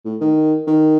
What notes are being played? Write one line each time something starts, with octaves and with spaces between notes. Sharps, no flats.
A2
D#3
D#3